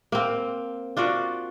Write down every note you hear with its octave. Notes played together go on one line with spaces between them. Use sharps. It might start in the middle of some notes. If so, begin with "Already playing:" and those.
A#3 C4
D4 F4 F#4 D5